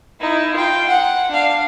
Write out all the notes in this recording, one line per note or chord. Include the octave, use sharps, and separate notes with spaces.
D#4 E4
F4 G5
F#5
D4 F5